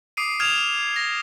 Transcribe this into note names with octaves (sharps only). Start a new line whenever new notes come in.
D6 D#6 C7 D7 D#7
D#6 F6 G#6 E7 F7
A#6